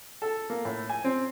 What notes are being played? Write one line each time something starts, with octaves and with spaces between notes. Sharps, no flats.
A4
A#3
A2
G#5
C4